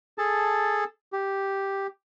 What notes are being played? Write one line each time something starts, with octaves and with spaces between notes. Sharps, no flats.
G#4 A4 A5
G4